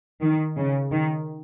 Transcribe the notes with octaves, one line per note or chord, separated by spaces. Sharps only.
D#3
C#3
D#3